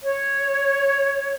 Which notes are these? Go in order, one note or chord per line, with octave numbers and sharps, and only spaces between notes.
C#5